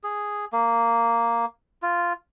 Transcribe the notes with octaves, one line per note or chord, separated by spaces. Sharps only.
G#4
A#3
F4